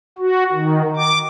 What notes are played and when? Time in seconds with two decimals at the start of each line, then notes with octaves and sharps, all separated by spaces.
0.18 F#4
0.53 D#3
0.96 D6